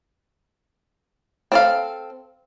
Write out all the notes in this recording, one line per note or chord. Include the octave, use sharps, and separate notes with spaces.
C4 A4 F5